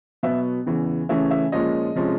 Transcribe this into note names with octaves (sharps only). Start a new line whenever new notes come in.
B2 F#3 B3 E5
E2 C#3 E3
C#3 E3 A3 C#4 E5
E5
A#2 F3 G#3 C#4 D#5
C3 F3 G#3 C#4